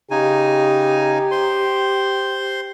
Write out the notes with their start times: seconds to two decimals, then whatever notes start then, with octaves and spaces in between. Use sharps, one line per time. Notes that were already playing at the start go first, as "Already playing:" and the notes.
0.11 C#3 D#4 G4 G#5
1.31 C5 C6